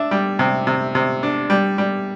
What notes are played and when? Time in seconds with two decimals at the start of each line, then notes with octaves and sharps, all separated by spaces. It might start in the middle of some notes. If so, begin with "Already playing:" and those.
Already playing: D4 E5
0.11 G3
0.39 C3
0.67 C3
0.95 C3
1.23 D4
1.50 G3
1.78 G3